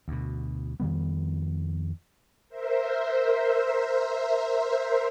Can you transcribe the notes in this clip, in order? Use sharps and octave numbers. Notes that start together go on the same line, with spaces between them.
D2 B2
F2 D#3 G3 B3
A#4 C5 E5